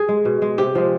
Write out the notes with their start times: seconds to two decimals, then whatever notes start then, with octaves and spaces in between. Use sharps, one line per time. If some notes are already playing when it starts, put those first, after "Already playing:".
Already playing: G#4
0.09 G#3
0.25 B2
0.42 G#3
0.58 C3 G4
0.75 F3 G#3